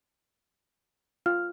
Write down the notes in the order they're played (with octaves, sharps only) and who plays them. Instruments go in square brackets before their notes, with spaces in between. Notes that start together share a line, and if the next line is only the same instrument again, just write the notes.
[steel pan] F4 [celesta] F6